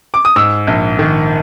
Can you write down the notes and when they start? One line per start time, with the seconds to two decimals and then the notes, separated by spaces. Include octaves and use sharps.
0.14 D6
0.25 D#6
0.36 G#2 E6
0.67 A#1
0.99 D#3